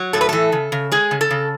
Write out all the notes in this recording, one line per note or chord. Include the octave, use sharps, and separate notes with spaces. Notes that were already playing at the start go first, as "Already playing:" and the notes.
Already playing: F#3
A2 A4
B4
E3 A4
C#3
C#3
G#3 G#4
C#3
A4
C#3